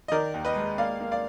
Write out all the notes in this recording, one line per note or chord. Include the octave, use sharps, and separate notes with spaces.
D#5
D#3 A#4 D5
D#2
B4 D#5
G#3
A#3 D5 F5
A#3
D5 F5